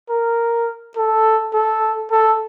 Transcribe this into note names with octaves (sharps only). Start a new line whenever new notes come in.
A#4
A4
A4
A4